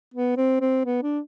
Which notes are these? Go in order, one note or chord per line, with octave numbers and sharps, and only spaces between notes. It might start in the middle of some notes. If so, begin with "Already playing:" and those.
B3
C4
C4
B3
D4